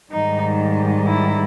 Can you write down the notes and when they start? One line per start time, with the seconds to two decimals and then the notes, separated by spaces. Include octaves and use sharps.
0.12 G#2 D#3 G3 D#4
1.07 E4